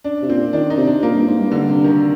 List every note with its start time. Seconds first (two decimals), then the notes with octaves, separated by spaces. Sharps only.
0.04 D4
0.22 C3
0.29 A#2 C4
0.53 D#3 D4
0.70 D#4
0.77 C3
0.87 D4
1.03 A#2 A#3
1.14 G2
1.28 G#2
1.39 G2
1.51 D3
1.68 C3
1.84 D#3